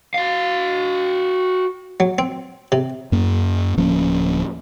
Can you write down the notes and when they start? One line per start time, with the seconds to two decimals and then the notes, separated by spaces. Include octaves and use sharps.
0.14 F#4 F5
2.00 F#3
2.18 C4
2.72 C3
3.12 F#2 A#3
3.77 D1 F3 A#3 C#4